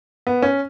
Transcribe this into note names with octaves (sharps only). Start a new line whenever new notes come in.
B3
C#4